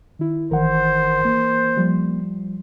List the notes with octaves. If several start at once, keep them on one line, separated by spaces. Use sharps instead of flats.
D#3 E4
G#1 D#3 E3 A#4 C5 F#5
A#3
F3 G3